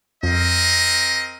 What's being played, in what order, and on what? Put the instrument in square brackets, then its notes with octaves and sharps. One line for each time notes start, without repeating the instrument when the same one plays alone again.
[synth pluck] F2 [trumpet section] C4 A#4 D#5